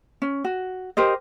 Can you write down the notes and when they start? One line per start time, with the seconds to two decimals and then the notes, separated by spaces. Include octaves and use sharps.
0.22 C#4
0.44 F#4
0.97 G4 A#4 C5 D#5